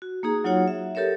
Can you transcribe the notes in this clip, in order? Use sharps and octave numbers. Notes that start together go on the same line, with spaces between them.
F#4
A#3 D#4 G#4 A#5
F#3 D#4 F4 F#4 C#5 F#5
E5
G4 A4 A#4 C#5 E5